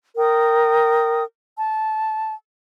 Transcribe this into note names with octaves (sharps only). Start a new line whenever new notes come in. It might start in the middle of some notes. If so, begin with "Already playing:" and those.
A#4 G5 D#6
A5